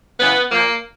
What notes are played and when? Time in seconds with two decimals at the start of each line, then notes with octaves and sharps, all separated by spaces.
0.19 F#2 C#3 E3 B3
0.51 A#2 F3 A#3